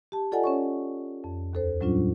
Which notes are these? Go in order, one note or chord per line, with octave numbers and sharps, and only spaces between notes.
G4 A5
F4 A4 D5 D#5 F#5 G#5
C#4 C#5 C#6
F2
D#2 A4 C5
A2 F#3 G3 C#4 D4 F4